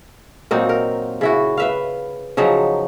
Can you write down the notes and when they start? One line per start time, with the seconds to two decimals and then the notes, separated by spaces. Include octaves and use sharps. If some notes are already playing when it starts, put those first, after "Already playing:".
0.51 A#2 F#3 C4 D#4
0.69 A#4
1.21 C#3 E4 F#4
1.57 B4 E5 F5
2.37 C#3 F3 F#3 D#4